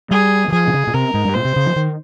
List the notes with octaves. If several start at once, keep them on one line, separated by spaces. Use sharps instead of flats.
G3 G#4
D#3
F3 G#4
C3
C#3
A#2
C3 A#4
G#2
G2
A#2 C5
C3
C#3
F3
D#3